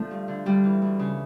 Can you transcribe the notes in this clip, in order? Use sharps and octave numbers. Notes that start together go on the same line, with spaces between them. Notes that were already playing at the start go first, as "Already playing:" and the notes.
Already playing: D3 F3 A3
G2
D3
D2 G3
E3
D2
C#3